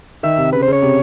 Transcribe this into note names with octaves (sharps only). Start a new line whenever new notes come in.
D#3 E5
C3
C#3 B4
C5
C#3
C#5
C3